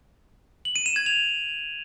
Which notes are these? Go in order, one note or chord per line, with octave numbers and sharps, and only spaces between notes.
F#7
D#7
E7
G#6
F7